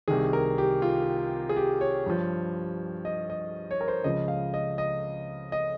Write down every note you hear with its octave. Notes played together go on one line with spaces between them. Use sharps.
C2 C3 D#3 G#4
A#4
G4
F4
G#4
G4
C#5
G2 F3
D#5
D#5
C#5
A#4
C5
C#2 C#3 F3 D#5
F5
D#5
D#5
D#5